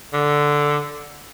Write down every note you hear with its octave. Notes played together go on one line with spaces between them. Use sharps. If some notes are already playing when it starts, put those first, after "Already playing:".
D3